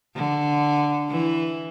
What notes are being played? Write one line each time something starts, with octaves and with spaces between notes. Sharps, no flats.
D3
E3